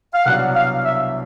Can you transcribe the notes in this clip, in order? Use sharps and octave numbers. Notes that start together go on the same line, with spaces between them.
F5
C2 B2 F#3 B3 D4 F#5
F5
E5